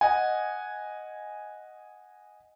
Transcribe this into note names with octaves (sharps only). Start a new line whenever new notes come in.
D#5 F#5 G#5